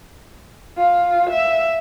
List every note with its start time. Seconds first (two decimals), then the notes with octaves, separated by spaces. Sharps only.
0.77 F4
1.30 E5